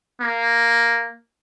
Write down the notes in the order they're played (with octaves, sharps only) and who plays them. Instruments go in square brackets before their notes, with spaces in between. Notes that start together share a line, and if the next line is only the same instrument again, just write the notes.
[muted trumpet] A#3